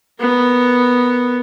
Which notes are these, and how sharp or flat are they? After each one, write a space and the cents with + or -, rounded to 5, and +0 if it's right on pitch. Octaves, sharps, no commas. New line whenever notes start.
B3 +0 A#4 +0